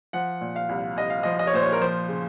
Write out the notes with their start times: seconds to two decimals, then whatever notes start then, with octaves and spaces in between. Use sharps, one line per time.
0.13 F3 F#5
0.41 A#2
0.56 F5
0.69 C2
0.97 C2 D#5
1.10 F5
1.23 F3 D#5
1.39 D#5
1.47 C#5
1.54 A#2 C5
1.62 C#5
1.72 A#4
1.81 F3 C5
2.09 C#3